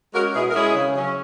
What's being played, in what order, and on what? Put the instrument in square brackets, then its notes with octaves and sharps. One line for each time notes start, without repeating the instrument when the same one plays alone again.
[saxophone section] G#3 F#4 A#4
C#4
B2 E4 G#4
A#4
G#3 C#4 E4 G#4
C#3
F#3 C#4